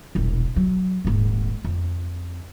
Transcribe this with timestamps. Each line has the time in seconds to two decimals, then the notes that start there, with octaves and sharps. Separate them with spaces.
0.15 E1 A#1
0.56 F#3
1.05 D#1 G#1
1.65 F2